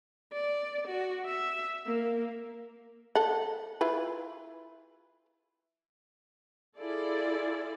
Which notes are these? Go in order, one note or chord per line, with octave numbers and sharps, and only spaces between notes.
D5
F#4
E5
A#3
A4 F#5
E4 F4 B4
E4 F4 G#4 A4 D5